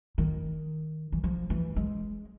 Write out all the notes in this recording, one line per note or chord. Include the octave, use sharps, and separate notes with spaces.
D#3
E3
F3
E3
G#3